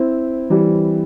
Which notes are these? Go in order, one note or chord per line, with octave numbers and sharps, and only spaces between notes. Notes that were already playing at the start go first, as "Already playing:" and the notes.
Already playing: C4 E4
E3 G3